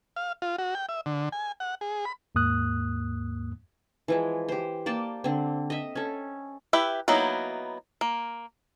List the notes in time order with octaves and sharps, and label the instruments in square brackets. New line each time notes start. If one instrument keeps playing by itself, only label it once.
[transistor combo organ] F5
F4
F#4
G5
E5
D3
G#5
F#5
G#4
B5
[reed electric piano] D#2 G#2 A#3 D#6 F#6
[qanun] E3 F3 G#3
G4 C5
A#3 D5 G5 A5
D3 C4
D#5 E5
C#4 A4
[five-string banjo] E4 G4 B4 E5
F#3 A#3 B3 D#4 E4
A#3